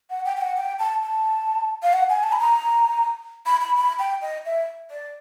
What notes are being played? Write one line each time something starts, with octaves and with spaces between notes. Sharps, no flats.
F#5
G5
G5
F#5
G5
A5
A5
F5
F#5
G#5
A5
B5
A#5
B5
B5
B5
G5
D#5
E5
D5